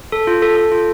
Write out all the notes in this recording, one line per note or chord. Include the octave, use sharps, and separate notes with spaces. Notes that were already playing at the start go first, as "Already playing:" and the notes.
A4
F4
A4
A4
F4